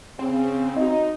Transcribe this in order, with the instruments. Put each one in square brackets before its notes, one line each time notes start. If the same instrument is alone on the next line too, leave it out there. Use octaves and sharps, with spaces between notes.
[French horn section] C#3 [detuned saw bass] C4
[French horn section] D#4 [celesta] F#4 D#5